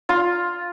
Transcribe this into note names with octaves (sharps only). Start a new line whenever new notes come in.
F4